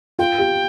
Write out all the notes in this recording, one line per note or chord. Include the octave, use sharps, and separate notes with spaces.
F4 G5
G4